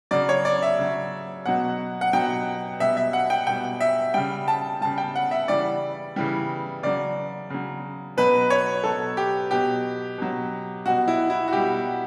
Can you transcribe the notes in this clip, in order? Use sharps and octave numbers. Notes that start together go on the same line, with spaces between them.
C#3 F#3 D5
C#5
D5
E5
C#3 F#3
B2 F#3 F#5
F#5
B2 F#3 G5
B2 G3 E5
E5
F#5
G5
B2 G3 G5
E5
C#3 G3 G5
A5
C#3 G3 A5
G5
F#5
E5
C#3 E3 G3 D5
C#3 E3 G3
C#3 F#3 D5
C#3 F#3
B2 F#3 B4
C#5
B2 F#3 A4
G4
B2 F#3 G4
B2 F#3
B2 G3 F#4
E4
E4
F#4
B2 G3 G4